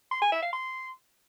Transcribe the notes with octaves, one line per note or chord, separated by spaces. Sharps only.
C6
G#5
E5
F5
C6